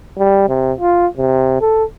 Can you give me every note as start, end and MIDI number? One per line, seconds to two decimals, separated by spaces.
0.18 0.45 55
0.49 0.73 48
0.80 1.07 65
1.17 1.59 48
1.61 1.84 69